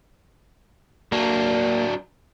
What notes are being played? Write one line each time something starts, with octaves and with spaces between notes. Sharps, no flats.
F#3 A#3 D4